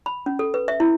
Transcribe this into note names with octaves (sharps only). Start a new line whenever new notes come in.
B5
C#4
A4
B4
E5
E4